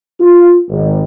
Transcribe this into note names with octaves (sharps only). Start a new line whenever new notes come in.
F4
G#1